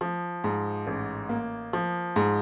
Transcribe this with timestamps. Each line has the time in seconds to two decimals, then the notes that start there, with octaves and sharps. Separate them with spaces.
0.01 F3
0.44 G#2
0.87 A1
1.29 A#3
1.73 F3
2.16 G#2